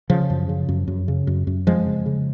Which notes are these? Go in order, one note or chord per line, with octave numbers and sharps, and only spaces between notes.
C#3 F3
F#2
C#3
F#2
F#2
C#3
F#2
F#2
F2 F3 G#3
C#3
C#3